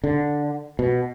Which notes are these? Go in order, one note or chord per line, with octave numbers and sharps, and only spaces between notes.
D3
B2